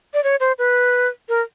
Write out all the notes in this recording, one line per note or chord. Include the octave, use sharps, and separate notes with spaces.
D5
C#5
C5
B4
A#4